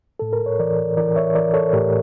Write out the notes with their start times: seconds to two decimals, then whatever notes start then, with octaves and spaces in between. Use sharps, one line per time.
0.19 A2 A4
0.33 A#4
0.46 C#5
0.59 E3 A#4 D5
0.97 E3 A#4 D5
1.16 C#5 E5
1.35 E3 A#4 D5
1.53 A4 C#5
1.73 A2 G4 A#4